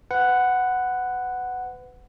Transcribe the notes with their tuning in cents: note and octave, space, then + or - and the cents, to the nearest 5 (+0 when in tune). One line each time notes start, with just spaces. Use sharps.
B4 +30 F#5 +0